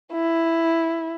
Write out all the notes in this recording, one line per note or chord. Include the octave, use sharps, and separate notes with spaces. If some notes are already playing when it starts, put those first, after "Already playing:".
E4